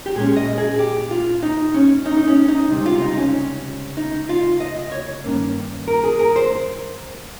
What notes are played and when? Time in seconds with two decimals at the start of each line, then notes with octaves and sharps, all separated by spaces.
0.06 G4
0.15 A#2 G#3 C#4 G#4
0.36 D#5
0.58 G#4
0.79 G4
1.11 F4
1.42 D#4
1.74 C#4
2.06 D#4
2.17 D#4
2.27 C#4
2.48 D#4
2.69 C#2 C3 G3 C4
2.86 F4
3.01 D#4
3.18 C#4
3.97 D#4
4.29 F4
4.60 D#5
4.92 C#5
5.24 G2 D#3 A#3 C#4
5.88 A#4
6.04 G#4
6.19 A#4
6.36 C5